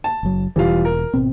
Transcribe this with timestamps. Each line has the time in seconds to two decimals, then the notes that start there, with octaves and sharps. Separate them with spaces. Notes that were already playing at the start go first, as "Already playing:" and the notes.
0.04 A5
0.23 F#1 F#3
0.56 E1 E3 G3 F4
0.85 A#4
1.14 G#1 B2 C4